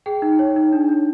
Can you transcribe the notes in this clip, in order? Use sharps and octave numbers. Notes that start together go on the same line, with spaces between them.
G#4 G5
D#4
C#5
D#4
D4
D4